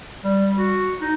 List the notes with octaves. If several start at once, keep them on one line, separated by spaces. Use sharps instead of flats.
G3
F#4
D#4